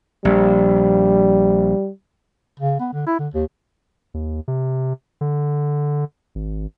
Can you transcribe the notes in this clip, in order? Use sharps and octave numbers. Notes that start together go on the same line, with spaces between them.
A#1 G3
C#3
B3
D3
E4
D3
D#2
D#2
C3
D3
G#1